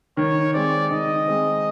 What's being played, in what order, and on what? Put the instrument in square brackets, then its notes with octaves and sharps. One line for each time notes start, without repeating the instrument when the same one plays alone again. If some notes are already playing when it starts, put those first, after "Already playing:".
[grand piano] D#3 [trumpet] C#5
[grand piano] G#3 C4 [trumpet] D5
[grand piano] D#3 [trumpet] D#5
[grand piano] G#3 C4